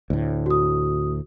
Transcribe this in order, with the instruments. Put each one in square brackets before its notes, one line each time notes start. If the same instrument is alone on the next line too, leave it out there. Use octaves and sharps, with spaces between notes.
[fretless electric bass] D2 A2
[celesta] F#4 D#6